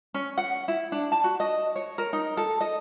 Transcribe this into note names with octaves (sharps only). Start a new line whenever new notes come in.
C#4
F#5
E4
D4
A5
F#4
D#5
C#5
A#4
D#4
A4
D#5